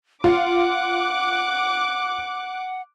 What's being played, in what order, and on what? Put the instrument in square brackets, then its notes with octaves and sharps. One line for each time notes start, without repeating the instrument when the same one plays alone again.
[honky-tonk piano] F4 [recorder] F#5 [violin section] D6 F#6